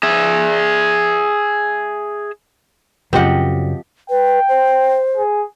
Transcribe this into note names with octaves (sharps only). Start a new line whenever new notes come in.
G#4 E5
F#2 C#3 F3 F#3 C4 G4 D#5 F#5
B4 G5
C5
G#4